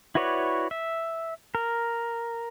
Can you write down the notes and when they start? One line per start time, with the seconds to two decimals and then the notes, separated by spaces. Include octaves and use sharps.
0.15 E4 F#4 B4 C#5 D5
0.71 E5
1.55 A#4